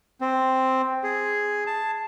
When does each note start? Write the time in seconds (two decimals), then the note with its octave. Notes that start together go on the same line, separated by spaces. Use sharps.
0.21 C4
1.04 G#4
1.67 A5